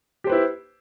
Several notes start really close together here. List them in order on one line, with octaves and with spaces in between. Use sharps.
G4 C5 B4 E4